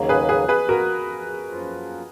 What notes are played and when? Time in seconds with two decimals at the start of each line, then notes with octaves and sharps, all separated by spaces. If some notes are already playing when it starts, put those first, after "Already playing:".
Already playing: D#2 C#3 F#3 A#3
0.09 G#4 B4
0.29 G#4 B4
0.49 G#4 B4
0.69 F#4 A#4
1.47 F#2 F3 A#3 F4